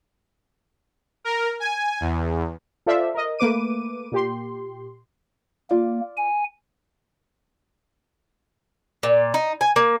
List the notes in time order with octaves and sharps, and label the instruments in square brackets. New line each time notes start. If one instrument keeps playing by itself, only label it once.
[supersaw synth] A#4
G#5
E2
[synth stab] F4 A4 C5 D5 E5 F5
A#4 D#5
A3 A#3 B4 D6 D#7
A#2 G4 C6
[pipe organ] A#3 [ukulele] F4 D5
[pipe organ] G#5
[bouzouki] A#2
D#4
G#5
A#3